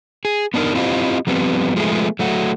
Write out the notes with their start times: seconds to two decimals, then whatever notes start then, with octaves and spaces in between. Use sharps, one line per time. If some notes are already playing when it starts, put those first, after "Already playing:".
0.25 G#4
0.54 B3 D4 D#4 F4 A#4
0.75 C4 E4 F4 G4 C5 D#5
1.27 F3 G3 B3 C4
1.76 F3 G#3 A3 B3 G#4
2.19 F#3 A3 F#4